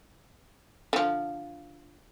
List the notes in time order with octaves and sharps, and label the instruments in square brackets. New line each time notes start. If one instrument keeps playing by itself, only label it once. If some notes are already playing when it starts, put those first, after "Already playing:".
[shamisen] D3 F3